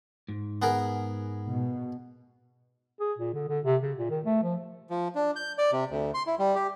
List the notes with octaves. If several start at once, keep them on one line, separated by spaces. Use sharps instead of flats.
G#2
B3 G#4 A#4
B2
G#4
A#2
D3
D3
C3
C#3
A#2
D#3
A3
F3
F3
D4
G6
D5
C3
D2
C6
E4
G3
G4